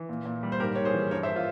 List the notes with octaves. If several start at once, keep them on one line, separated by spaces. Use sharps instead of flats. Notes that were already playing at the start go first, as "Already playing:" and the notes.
Already playing: E3
A#2
A#2
G3
C5
G#2 G4 A#4
G#2 C#5
G#4 C5
E3
G2 A#4 C#5
C5 E5
F4